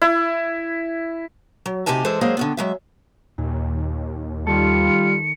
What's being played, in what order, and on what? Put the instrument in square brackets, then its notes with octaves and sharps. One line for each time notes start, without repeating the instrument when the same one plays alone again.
[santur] E4
[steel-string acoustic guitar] F#3
D2 C3 D#4 G4 G#5 A5
E3 G#3 G#4 A4 C5
F#3 G#3 A#3 G#4 C5
D3 D#3 B3
F#3 G#3 E5
[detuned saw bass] D#2 [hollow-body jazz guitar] A#2
[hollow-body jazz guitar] D#3 A4 [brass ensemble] G3 F4 [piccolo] C#7